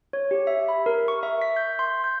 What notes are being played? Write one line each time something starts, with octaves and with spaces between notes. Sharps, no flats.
C#5
G4
E5
B5
A#4
C#6
E5
B6
G6
C6
G6